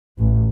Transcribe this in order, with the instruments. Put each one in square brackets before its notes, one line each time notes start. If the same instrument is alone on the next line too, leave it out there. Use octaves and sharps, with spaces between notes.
[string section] A1